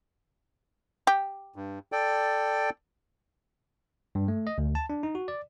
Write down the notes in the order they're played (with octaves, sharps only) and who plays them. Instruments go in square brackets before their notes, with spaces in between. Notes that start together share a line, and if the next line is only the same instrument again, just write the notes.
[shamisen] G4
[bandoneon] G2
A4 D5 G5
[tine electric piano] G2
A3
D#5
D2
A5
D4
D#4
F#4
D5